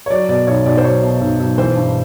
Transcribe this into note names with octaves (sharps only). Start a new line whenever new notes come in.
C#5
F#3 D5
B2 D5
B1 C#5
B1 D5
C5
F#3 C#5
B2
B1
B1
E3 C5
G2